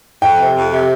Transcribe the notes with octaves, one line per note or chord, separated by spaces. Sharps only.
F2 G5
C3
F2
C3